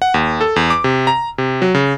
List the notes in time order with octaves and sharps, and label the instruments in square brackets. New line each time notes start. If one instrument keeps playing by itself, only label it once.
[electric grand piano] F#5
D#2
A4
E2
D6
C3
A#5
C3
F#3
C#3